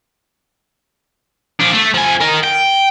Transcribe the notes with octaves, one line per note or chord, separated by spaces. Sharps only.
F3 D4
A3
F3 G#5
A#4 D#5
G5